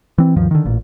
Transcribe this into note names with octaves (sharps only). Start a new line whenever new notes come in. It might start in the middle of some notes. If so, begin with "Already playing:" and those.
E3 C4
D2 G2 D#3 F3
D3 D#3
A1 A#2